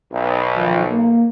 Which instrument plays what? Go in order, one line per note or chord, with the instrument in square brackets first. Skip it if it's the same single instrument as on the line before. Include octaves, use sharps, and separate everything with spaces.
[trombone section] B1
[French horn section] D2 D#3 F3
A#3